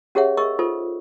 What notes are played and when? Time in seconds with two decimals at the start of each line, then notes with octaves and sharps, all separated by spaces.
0.15 C#4 G4 G#4 C#5 E5 F#5
0.37 A#4 D#5 C#6 E6
0.59 D#4 F4 A4 C5